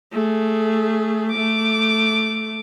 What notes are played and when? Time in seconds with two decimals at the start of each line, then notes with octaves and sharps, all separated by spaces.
0.12 A3 G#4
1.32 A3 D6